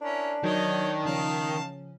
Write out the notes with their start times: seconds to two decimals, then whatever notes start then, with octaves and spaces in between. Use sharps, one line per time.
0.01 C#4 D4 E4 A#4
0.44 D#3 F#3 D#4 C#5 D#5 G6
1.05 C#3 F3 C#4 F5 A5